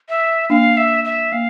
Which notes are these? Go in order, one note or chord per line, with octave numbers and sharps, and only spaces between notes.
E5
A#3 D4 F5
E5
E5
A#3 F5